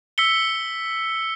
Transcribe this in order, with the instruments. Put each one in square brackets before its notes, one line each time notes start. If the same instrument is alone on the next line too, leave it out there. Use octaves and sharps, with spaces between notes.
[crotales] E6 B6 C#7 G7